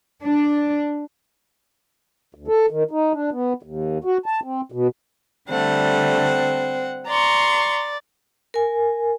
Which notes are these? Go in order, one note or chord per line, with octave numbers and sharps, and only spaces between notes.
D4
D2
A4
D#3
D#4
D4
B3
D#2
F#4
A5
C4
B2
D3 G3 A3 C4 F#5
D5 A#5 C6 C#6
A#4 G#5